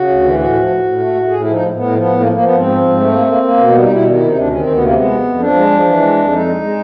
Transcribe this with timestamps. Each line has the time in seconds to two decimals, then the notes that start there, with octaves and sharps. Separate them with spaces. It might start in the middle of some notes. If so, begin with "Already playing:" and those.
Already playing: C#3 F#4
0.08 D2
0.23 E3
0.38 A2 F#4
0.53 F3
0.68 A2
0.83 A2
0.99 A3
1.14 A2
1.29 A2 G#4
1.40 F3 E4
1.52 D#4
1.60 A2
1.75 A2 B3
1.90 F3
1.98 B3
2.06 A2
2.20 F3 A#3
2.32 F3 A#3
2.44 B3
2.51 G#2 C4
2.66 F3
2.81 G#2
2.97 A3
3.11 A#3
3.27 A#3
3.42 A#3
3.57 B2 B3
3.69 G3 B3
3.80 D#4
3.88 B2 E4
4.04 D#3
4.14 C3 E4
4.26 D#4
4.34 D2 D4
4.48 D#3 C#4
4.60 D2 C4
4.72 B3
4.78 C3 A#3
4.93 G#3 B3
5.10 F2
5.25 F2
5.39 F3 D4
5.55 G#3
5.71 F3
5.85 E3
6.00 G#3
6.16 F2
6.31 G#3 D#4
6.46 G#3
6.61 G#3